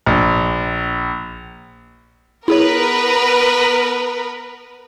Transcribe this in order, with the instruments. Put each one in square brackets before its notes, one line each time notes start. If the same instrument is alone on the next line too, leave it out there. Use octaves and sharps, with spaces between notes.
[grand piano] A#1
[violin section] B3 A#4 B4 [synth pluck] E4 G#4 C#5